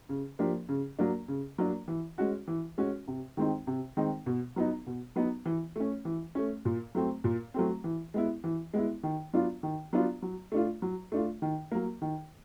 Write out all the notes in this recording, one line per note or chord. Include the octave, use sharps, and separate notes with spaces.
C#3
F3 A#3 D4 G4
C#3
F#3 A#3 D4
C#3
F#3 A#3 D4
E3
G#3 C#4 F#4
E3
G#3 C#4 F#4
C3
D#3 G#3 C4 D#4
C3
D#3 G#3 C4 D#4
B2
F#3 B3 D#4
B2
F#3 B3 D#4
E3
A3 C#4
E3
A3 C#4
A#2
F#3 A3 C4
A#2
F#3 A3 C4
E3
G#3 B3 E4
E3
G#3 B3 E4
D#3
F#3 B3 D4 F4
D#3
F#3 B3 D4 F4
F#3
A3 D4 F4
F#3
A3 D4 F4
D#3
F#3 A#3
D#3